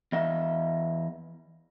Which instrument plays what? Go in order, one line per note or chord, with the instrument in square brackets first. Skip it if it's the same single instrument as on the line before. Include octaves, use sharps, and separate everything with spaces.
[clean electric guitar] E2 D#5 E5